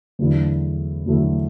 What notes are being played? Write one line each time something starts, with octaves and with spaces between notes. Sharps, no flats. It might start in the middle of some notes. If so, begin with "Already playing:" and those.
E2 D3 F#3 A3 E4
E2 D3 F#3 A3 E4